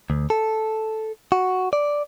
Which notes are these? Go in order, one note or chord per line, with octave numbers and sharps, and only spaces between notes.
D2
A4
F#4
D5